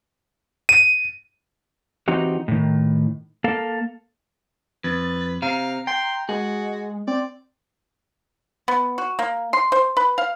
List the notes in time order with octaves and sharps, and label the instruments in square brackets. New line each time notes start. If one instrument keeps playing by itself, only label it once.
[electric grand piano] D#7
[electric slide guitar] E3 C4 D#4 F#4 G4
A2 D#3
A#3 A4 F5
[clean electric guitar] F2 [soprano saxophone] B4 [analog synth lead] A6
[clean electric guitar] C3 [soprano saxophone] F5 [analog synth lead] A#5
[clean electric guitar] G5 [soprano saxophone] C6
[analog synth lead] G#3 [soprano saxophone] F#4 [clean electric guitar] G#4
[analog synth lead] C4 [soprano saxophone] D5
[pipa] B3
F#4
A#3
C6
C5
B4
F5